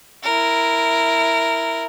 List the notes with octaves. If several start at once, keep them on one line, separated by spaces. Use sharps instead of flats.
E4 A#4